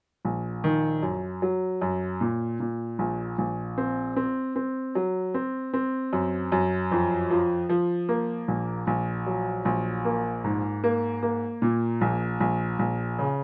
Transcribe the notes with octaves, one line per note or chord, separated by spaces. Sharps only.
A#1
D#3
F#2
F#3
F#2
A#2
A#2
A#1
A#1
C4
C4
C4
F#3
C4
C4
F#2
F#2
F2
F3
F3
A#3
A#1
A#1
F#3
A#1
A#3
G#2
A#3
A#3
A#2
A#1
A#1
A#1
C#3